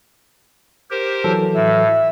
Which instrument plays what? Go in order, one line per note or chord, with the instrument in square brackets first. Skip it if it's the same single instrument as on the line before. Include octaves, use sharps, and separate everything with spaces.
[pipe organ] G4 A#4 C5
[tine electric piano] E3 F#3 A4
[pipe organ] A2 [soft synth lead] E5